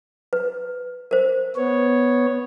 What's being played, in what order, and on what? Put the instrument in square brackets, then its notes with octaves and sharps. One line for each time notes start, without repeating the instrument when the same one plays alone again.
[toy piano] B4
A#4 C5
[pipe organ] B3 C#5